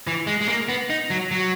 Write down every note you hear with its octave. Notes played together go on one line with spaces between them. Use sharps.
E3
G#3
G#3
A#3
B3
D#4
F#3
F#3